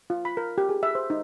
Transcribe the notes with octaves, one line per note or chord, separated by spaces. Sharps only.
F4
B5
A#4
G4
G#4
E5
C5
D#4